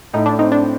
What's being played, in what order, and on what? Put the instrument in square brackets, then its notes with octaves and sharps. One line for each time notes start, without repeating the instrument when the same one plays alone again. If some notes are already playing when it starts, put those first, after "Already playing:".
[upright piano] A2 [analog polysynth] D#4
[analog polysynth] D4
[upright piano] C4 [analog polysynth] D#4
[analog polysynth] D4